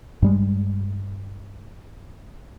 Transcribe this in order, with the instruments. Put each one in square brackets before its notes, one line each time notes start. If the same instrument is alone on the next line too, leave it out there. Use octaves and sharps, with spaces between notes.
[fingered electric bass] G2 G3 G#3